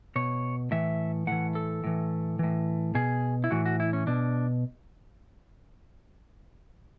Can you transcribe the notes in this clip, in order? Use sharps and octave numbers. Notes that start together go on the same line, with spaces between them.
B2 C#5
A2 E3 E5
A2 E3 F#5
A4
A2 E3
A2 E3
B2 G#4
E4
A2 E3 F#4
F#4
E4
C#4
B2 D4